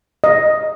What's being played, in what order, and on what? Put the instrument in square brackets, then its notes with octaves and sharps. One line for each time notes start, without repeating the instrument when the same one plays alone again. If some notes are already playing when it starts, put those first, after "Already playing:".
[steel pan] D#5